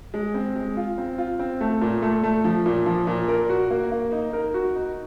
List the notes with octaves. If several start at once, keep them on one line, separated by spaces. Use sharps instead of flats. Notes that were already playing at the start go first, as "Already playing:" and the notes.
G#3
C4
G#3
F4
C4
F4
C4
A3
A#2
A3
A3
F3
A#2
F3
A#2
A#4
F#4
A#3
A#3
D#4
A#4
F#4
D#4